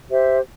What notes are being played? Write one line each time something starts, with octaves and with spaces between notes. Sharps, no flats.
G4 C5 E5